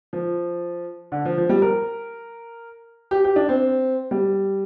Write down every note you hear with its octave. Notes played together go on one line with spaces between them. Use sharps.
F3
D3
F3
F3
G3
A#4
G4
G4
D4
C4
G3